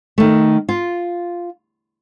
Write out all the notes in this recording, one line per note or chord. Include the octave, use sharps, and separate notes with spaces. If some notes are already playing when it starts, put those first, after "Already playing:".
D#3 A3
F4